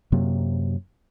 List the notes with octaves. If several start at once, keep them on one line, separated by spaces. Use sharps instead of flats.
F#2 C3 F#3 A#3